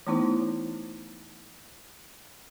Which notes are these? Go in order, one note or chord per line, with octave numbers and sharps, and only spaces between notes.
E3 A3 B3 D#4 E4 C5